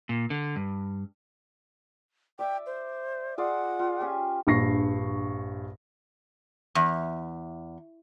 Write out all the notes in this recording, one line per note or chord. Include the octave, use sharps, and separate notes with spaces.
A#2
D3
G2
D5 E5 G5
C5
F4 G#4 D5 F#5
F4
C#4 G4 G#5
A#1 G2 C#6 A#6 C7
E2